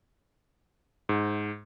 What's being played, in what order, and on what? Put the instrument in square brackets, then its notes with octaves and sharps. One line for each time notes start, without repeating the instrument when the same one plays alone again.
[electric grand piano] G#2